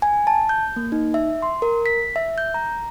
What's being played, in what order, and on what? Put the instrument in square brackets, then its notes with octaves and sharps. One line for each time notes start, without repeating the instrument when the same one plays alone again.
[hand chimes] G#5
A5
G6
A#3
D#4
E5
C6
A#4
B6
E5
G6
A#5